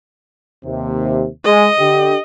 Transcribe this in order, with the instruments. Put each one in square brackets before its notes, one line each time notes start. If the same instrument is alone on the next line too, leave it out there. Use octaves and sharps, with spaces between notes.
[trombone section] D#2 C3
[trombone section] G#3 [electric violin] D#5
[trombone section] D3 G4